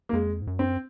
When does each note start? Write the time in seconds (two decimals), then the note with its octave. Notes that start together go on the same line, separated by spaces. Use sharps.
0.09 A#3
0.13 F2 G#3
0.42 G#2
0.47 F#2
0.59 C4